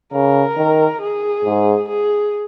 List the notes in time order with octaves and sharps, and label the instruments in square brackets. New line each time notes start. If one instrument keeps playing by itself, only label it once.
[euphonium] C#3 [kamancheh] A#4
[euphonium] D#3
[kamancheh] G#4
[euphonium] G#2
[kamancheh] G#4